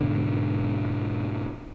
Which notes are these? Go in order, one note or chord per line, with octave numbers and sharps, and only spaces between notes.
G#2 B2 D3